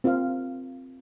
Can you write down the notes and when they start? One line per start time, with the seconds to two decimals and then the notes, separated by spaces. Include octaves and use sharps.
0.04 C4 F4 A#4 F5